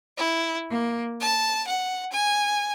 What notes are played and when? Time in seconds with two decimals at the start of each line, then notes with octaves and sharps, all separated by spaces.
0.18 E4
0.71 A#3
1.21 A5
1.66 F#5
2.12 G#5